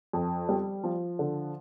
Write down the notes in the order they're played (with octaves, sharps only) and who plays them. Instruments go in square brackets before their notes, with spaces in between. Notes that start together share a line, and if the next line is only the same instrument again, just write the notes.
[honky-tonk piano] F2
G3
F3
D3